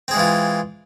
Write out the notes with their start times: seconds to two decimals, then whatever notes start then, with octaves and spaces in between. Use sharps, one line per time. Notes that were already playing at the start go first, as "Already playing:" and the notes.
0.08 C4
0.11 G#4
0.14 G#3
0.17 E3
0.19 F4